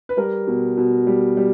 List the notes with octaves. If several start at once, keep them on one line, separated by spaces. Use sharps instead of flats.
B4
G3 A#4
B2
B2
G3
G3